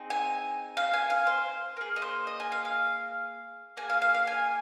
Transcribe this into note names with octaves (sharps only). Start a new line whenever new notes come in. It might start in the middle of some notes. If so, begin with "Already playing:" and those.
Already playing: C4 D#4 G#4
G#5
F5
G#5
F5
C5
A#3 G#4
D#5
C5
D#5
G#5
F5
F5
A#3 G#4 G#5
F5
F5
F5
G#5